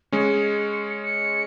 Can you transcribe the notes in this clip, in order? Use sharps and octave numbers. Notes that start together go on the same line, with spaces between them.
G#3 C#4 C#7
C#7